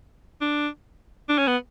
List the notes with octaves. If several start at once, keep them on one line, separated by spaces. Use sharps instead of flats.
D4
D4
C#4
B3